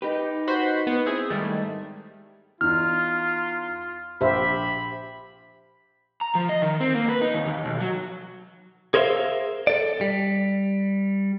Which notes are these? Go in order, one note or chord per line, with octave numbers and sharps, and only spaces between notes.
D#4 G4 B4
F#4 C5 B5
B3
C4 E4 G#4
G#2 D#3 G3 A3
E2 D#4 F4 F6
A#1 G4 C5 E5 B5
A#5
F3
D#5
D#3
C4
A#3
B4
D#4
D#2
D#2
B1
F#3
G#4 A#4 C5 C#5 E5 F5
A4 D5
G3